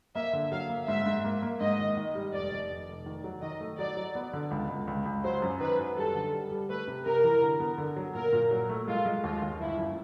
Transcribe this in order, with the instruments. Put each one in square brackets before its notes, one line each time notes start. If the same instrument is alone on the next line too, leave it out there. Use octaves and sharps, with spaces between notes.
[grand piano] A#3 [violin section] E5
[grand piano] D3
[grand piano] F#3 [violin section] F5
[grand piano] A#3
[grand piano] G#2 [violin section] E5
[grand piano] G#2
A#3
A#3
[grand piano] G#2 [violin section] D#5
[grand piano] D#3
D#3
G3
[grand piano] F1 [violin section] D5
[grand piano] F1
F1
F1
D#3
F#3
[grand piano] D#3 [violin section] D#5
[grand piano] A3
[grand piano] F#3 [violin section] D5
[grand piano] F#3
B3
D3
C#2
C#2
C#2
C#2
[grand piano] F#3 [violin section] C5
[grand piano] F#2
[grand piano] D#3 [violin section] B4
[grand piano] F#3
[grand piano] G3 [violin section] A4
[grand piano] D3
G3
G3
[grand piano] A3 [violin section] B4
[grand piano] C3
[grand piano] C3 [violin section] A#4
[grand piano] E3
D3
B3
D3
F#3
[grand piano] A#2 [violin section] A#4
[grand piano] A#2
F#3
A3
[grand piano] G#3 [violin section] F4
[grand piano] G#3
[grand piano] D#2 [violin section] F4
[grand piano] D#2
[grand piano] G1 [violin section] E4
[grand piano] F#2